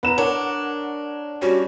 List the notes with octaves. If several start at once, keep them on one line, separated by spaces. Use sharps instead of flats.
E2 B4 A#5 E7
D4 A#4 C#5 F#5
G3 C#4 F#4 C#5